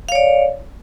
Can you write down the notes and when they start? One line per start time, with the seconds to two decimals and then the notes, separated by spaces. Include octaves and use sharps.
0.09 F5
0.12 C#5
0.15 D5